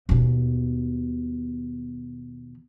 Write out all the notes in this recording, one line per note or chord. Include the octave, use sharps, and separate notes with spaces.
D#2 B2